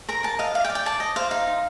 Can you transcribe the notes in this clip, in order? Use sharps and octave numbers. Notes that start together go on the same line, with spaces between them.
A#4 A#5
A#4 A5
D#5 F5
D5 F5
G5
D5
G5
D5 A5
D5 D#5
C5 F5
D#4 F5
D#4